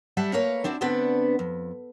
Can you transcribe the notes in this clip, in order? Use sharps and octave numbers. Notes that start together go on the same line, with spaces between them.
G3 E5 F#5 A5
A3 A#3 A#4 B4 C#5 F5
C4 D4 E4 F#4
D2 B3 C4 D4 B4 F#5
F2